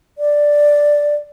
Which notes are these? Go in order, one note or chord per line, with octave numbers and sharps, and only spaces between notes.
D5